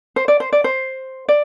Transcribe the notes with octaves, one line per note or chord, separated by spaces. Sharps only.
C5
D5
C5
D5
C5
D5